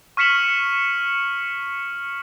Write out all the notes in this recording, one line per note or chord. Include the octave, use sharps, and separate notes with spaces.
C#6 F6 B6 C#7 E7 F#7